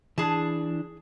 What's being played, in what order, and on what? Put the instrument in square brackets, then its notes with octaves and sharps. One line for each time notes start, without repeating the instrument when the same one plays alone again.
[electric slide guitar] E3 D4 [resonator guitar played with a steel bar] G#4 A5